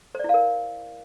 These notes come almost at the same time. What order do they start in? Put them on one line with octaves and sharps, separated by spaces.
C5 D5 E4 F5 A#4